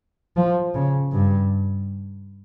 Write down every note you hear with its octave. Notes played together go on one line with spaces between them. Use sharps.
F3
C#3
G2